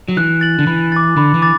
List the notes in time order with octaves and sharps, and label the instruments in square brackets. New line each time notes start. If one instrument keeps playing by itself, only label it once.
[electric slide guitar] F#3
[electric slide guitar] E3 [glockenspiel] F#6
[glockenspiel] A6 F#7
[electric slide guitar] D3
[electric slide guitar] E3 [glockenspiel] B5
[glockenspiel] D6 A6
[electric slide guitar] D3 [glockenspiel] B5
[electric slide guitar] E3
[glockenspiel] D6 A6